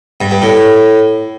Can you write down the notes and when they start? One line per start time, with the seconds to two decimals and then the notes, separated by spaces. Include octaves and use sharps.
0.21 G2
0.31 G2
0.42 A2